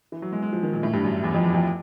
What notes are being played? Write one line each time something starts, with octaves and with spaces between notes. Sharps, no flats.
E3
F#3
G#3
G#3
F3
D#3
A#2
A2
G2
F#2
E2
F2
E2
F2